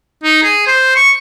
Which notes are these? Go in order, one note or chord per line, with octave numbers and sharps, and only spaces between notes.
D#4
G#4
C5
C#6